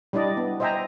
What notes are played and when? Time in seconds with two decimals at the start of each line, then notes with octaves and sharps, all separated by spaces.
0.13 G3 D4 E4 D5 D#5
0.37 B3
0.60 C5 D#5 E5 G5 G#5 A#5